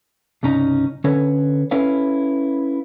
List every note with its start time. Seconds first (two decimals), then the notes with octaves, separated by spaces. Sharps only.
0.43 C2 G2 C#3 C#4 D#4 A#5
1.04 D3 C#4 A4 B4 C#5
1.71 C#4 E4 A4 B4 C#5 F5